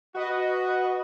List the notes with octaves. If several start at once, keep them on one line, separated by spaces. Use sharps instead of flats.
F#4 B4 D#5